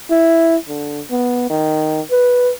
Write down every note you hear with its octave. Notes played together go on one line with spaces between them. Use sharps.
E4
D3
B3
D#3
B4